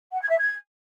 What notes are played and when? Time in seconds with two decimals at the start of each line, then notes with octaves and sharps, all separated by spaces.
0.12 F#5
0.21 G#6
0.29 E5
0.38 G#6